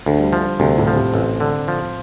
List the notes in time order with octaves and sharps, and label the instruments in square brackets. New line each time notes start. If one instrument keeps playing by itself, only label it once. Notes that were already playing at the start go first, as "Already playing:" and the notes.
[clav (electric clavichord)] D2 [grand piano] D3
[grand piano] G3
[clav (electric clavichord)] F3
[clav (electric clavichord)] D2 [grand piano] C3
[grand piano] A2
[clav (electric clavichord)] F3
[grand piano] C3
[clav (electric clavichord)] A1 [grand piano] C4
[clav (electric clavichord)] D3
F3